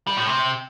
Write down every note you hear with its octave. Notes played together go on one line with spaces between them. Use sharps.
G3
A2
C3